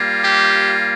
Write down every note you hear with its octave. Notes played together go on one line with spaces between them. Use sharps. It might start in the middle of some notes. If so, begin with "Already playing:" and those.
Already playing: G3 A#3 F4
G4